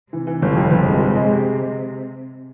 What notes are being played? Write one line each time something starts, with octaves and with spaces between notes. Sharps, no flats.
C3 E3
E3
G1
F2
G1
G#3
G#3
G#3
G4